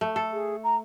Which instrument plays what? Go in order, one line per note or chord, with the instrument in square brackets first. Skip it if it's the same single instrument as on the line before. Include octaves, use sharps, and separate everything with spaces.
[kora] A3
A4
[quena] G#4
A#5